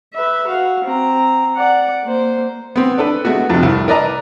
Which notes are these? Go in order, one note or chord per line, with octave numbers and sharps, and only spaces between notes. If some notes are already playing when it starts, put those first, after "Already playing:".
B4 E5
F#4 F5
C4 A#5
D5 F#5
A#3 C5
B3 C4
D4 A4 B4
G#3 A3 B3 F#4
F2 C3
C2
A#4 B4 D5 D#5 A5 A#5